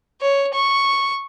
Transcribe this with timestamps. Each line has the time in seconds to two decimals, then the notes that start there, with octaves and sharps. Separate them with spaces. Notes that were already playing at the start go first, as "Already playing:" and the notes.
0.21 C#5
0.54 C#6